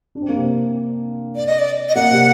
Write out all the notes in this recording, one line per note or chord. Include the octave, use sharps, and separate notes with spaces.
D4
C4
A#3
C3 C4
D5
D#5
D5
D#5
A#3 F#5
C3 C4